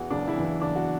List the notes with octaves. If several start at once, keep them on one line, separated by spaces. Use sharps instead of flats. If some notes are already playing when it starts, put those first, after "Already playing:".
Already playing: E2 E3 F#4
F#1 D4
E4
E2 E3
E4
F#1 D4
F#4